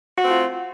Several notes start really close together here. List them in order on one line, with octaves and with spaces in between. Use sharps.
F#4 C4 A3 F4